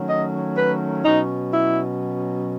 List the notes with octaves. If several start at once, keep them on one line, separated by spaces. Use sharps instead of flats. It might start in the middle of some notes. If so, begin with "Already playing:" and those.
Already playing: D#3 F#3 A3 C#4
D#5
B4
B2 F#3 C#4 D#4
E4